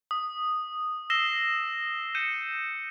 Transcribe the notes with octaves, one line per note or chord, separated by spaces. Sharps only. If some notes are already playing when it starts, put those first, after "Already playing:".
D#6
E6 A#6 C7 E7 G7
G6 C#7 D#7 E7